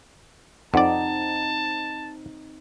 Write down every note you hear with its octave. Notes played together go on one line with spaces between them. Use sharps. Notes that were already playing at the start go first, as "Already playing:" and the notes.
F2 C4 D#4 D5 F#5 A5